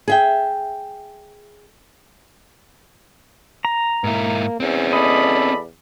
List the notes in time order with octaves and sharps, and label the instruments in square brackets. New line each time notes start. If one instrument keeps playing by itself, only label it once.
[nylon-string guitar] G#4 E5 G5
[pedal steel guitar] A#5
[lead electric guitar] G#2 E4 [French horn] A#3
[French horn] E2 [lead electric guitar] C4 C#4
[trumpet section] A4 D5 B5 [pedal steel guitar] D#5